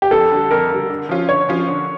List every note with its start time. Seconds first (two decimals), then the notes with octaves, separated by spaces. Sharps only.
0.02 G4
0.11 F2 A4
0.31 D3 G3
0.51 F2 A#4
0.70 D3 G3
0.90 D3
1.09 F3 C#4 F4
1.29 D3 C#5
1.49 F3 C#4 F4
1.68 D3